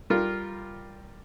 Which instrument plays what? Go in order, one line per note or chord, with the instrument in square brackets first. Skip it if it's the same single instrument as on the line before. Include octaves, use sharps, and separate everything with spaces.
[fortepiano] G3 F4 A#4